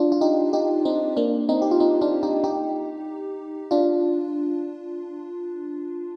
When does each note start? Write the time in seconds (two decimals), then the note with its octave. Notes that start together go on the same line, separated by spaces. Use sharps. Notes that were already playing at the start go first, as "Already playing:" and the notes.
Already playing: D4 F4
0.12 F4
0.21 D#4 G4
0.53 D#4 G4
0.85 C4 D#4
1.17 A#3 D4
1.49 C4 D#4
1.62 G4
1.71 F4
1.80 C4 D#4
2.01 D4 F4
2.23 D#4 G4
2.44 D#4 G4
3.71 D4 F4